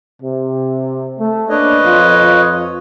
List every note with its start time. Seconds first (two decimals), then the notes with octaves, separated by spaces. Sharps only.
0.23 C3
1.19 A3
1.49 A#3 C#4 D4 B4 C#5 D#5
1.84 F2 F4